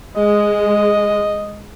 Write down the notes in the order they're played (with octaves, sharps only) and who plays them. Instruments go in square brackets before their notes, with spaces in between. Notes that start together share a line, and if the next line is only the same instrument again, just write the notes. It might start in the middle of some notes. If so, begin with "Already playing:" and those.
[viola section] G#3 [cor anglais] D#5